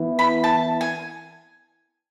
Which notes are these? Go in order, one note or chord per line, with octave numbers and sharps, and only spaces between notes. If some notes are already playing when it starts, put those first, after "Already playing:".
Already playing: E3 B3 E4
B5
A5
G#5